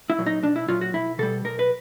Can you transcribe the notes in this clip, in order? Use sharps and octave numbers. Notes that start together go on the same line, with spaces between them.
E4
A#2 F#3
D#4
B1 D4
E4
A#2 F#3 F4
F#4
B1 E4
B2 G3 A4
B1 A#4
B4